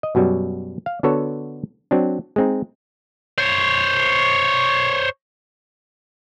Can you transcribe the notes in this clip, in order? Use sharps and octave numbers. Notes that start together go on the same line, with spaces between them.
D#5
F#2 B2 F#3 G3
F5
D3 B3 F#4 A4 C#5
F#3 C4 D4
G#3 C4 D#4
C5 C#5